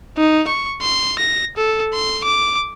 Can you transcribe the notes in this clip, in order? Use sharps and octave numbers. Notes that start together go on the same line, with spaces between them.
D#4
C#6
C6
A#6
A4
C6
D6